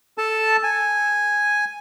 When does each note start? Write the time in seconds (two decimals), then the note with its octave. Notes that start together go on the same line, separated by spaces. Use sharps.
0.18 A4 A5
0.63 G#5